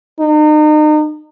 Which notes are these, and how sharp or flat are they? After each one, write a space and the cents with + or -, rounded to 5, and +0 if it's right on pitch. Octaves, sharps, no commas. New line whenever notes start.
D#4 -35